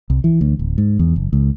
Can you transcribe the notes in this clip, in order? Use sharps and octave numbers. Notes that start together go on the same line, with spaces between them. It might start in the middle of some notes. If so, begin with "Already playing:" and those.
C2
E3
D2
D1
G#2
E2
F#1
C#2